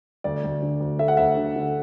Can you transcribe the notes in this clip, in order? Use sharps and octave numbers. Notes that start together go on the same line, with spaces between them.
D2 D5
D2
D3
D2
A3 E5
F#5
D2 E5
D3
D3